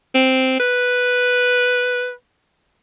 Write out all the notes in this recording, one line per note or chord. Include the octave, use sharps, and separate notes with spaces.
C4
B4